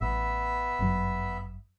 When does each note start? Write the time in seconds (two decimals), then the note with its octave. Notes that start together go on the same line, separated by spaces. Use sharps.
0.01 A1 B3 E5
0.79 G1 F#2 F#3